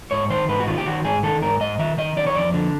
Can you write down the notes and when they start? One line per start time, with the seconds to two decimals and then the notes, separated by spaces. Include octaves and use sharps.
0.11 G#2 C#5
0.30 D#3 C5
0.49 G#2 B4
0.60 F#4
0.67 D#3 F4
0.78 G4
0.86 D#3 F#4
1.05 G#2 G#4
1.23 D#3 A4
1.42 G#2 A#4
1.61 G#2 D#5
1.79 D#3 E5
1.98 D#3 D#5
2.17 D#3 D5
2.27 C#5
2.35 F2 D5
2.54 D3